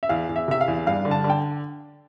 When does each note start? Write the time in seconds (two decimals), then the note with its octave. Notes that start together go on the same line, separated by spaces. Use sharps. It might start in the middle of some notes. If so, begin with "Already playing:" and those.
0.03 E5
0.09 E2 F5
0.29 E2
0.36 E5
0.48 C3 E5
0.61 F5
0.68 E2
0.87 G2 F5
1.05 D3
1.11 A5
1.24 D3
1.30 G5